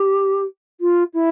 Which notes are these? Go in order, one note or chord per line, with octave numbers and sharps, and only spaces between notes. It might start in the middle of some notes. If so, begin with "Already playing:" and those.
Already playing: G4
F4
E4